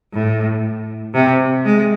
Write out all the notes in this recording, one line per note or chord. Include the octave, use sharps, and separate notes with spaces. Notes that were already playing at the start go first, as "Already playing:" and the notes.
A2
C3
G#3